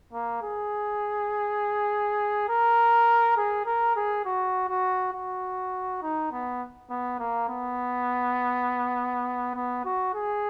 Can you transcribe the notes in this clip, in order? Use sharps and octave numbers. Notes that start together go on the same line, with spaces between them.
A#3
G#4
A#4
G#4
A#4
G#4
F#4
F#4
F#4
D#4
B3
B3
A#3
B3
B3
F#4
G#4